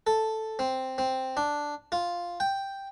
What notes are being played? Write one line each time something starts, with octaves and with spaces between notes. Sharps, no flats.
A4
C4
C4
D4
F4
G5